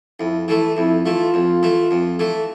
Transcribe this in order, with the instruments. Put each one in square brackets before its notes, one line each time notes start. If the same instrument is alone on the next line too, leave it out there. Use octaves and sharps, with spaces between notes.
[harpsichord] F2 [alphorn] E4
[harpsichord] E3 A3 [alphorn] E4
[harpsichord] F2 [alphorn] E4
[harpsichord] E3 A3 [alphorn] F4
[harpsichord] F2
E3 A3
F2
E3 A3